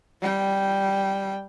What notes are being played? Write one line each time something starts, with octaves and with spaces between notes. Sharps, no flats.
G3 G5